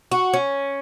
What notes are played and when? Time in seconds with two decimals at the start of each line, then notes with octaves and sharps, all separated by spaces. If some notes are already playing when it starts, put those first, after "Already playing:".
0.11 F#4
0.34 C#4